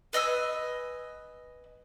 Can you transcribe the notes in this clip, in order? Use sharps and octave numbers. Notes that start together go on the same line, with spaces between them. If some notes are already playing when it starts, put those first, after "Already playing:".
B4 D#5 G#5 E6